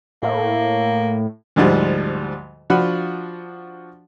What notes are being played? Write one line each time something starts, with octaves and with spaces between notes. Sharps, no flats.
A2 A#3
D2 G#2 F3 G3
F3 D4 F4 F#4 F#5 B5